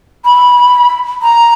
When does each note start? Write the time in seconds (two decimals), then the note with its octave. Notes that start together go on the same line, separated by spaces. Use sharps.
0.25 B5
1.22 A#5